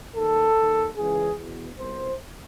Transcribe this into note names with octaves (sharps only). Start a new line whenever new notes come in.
D#2 D#3 A4
D#2 D#3
C#2 C#3 E3 G#4
E2 B2
C2 B2 C5